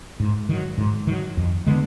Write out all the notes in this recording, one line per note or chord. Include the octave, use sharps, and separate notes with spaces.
G#2
D#3 F#3
G#2
D#3 F#3
F2
D3 G#3 B3